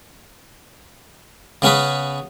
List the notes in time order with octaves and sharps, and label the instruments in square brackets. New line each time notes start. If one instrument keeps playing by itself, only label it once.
[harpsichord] C#3 B3 C#4 G#4 B4